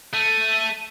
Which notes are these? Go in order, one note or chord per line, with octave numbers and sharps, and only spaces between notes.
A3 D#7